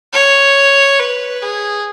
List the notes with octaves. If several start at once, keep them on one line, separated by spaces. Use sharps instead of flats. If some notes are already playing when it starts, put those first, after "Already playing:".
C#5
B4
G#4